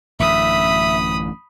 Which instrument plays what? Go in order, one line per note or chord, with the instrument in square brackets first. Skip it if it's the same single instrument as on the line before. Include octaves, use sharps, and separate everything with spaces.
[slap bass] A1 F#2 D3 [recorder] E5 [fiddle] B5 D#6